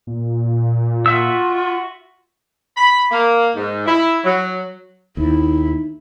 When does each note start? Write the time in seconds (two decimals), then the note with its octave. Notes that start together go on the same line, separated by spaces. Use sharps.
0.07 A#2
1.06 F4 F#4 E5 E6
2.76 B5
3.11 A#3
3.56 G#2
3.87 E4
4.24 F#3
5.17 D#2 D#4 E4